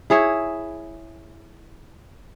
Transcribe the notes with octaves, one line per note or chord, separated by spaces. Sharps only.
E4 G#4 C#5 E5